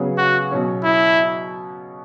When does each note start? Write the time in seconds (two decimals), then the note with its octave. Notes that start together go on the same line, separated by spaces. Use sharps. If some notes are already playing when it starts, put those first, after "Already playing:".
Already playing: C#3 F#3 B3 G#4 C#5
0.18 F#4
0.51 B2 F#3 C#4
0.84 E4